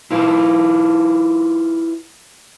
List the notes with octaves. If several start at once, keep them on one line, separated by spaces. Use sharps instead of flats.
E4 F4 B4